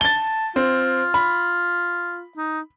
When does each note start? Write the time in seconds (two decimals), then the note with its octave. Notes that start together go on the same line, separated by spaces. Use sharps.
0.01 A5 A6 G7
0.56 C4 F4
1.14 B5
2.37 D#4